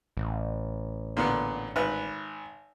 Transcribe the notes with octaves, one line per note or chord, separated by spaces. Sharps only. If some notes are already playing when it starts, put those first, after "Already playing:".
A1
A#2 D3 B3
G#1 B4